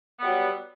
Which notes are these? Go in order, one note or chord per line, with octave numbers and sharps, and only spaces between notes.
F#3 G3 B3